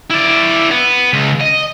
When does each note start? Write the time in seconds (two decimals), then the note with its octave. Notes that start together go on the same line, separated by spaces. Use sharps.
0.11 E4 D5
0.71 B3
1.13 C#2
1.41 D#5